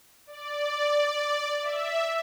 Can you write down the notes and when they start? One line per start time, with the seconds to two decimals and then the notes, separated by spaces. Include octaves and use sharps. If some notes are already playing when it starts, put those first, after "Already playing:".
0.27 D5
1.62 E5